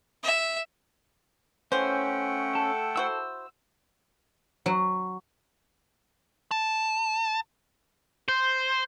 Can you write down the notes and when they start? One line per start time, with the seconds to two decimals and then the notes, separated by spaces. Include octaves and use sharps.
0.23 E5
1.72 E3 A3 C#4 C5 F#5 G5
2.55 A4
2.96 E4 F#4 C5 E6
4.66 F#3
6.51 A5
8.29 C5